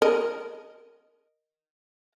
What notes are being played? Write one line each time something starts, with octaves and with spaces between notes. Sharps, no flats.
A#4 D#5